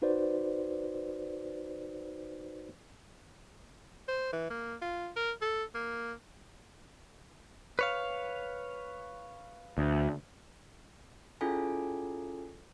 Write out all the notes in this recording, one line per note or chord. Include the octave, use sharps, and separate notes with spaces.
D#4 F#4 B4 C5 D5
C5
E3
A#3
F4
A#4
A4
A#3
B4 C#5 F5
D2
C#4 E4 F4 G#4 A4 G#5